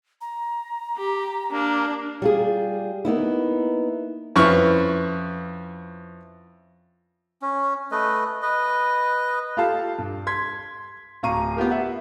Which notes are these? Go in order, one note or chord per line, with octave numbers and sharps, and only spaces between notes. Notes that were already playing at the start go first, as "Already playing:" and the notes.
A#5
G4
A#3 D4
G3 F4 G#4
A#3 B3 D#4 E4
F2 C#4 E4 B4 C#6 F6
C#4
A3 B4 D#5
B4 D#5
F4 G4 A4 F5 A5
G2
C6 G#6 B6
D1 F5 A#5 C#6 D#7
B3 F4 G4 A#4
E5 F#5